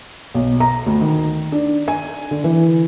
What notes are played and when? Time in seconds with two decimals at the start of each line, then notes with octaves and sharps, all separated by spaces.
0.35 B1
0.60 A#5
0.86 D2
1.01 D#3
1.52 D4
1.88 G#5
2.31 D3
2.44 E3